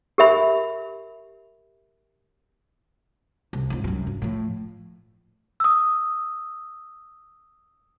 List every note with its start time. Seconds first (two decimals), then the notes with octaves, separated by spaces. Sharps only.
0.18 G4 A#4 E5 B5
3.53 C2
3.70 F2 G#2
3.84 C2 F#2
4.07 G2
4.22 A2 F3
5.60 D#6 E6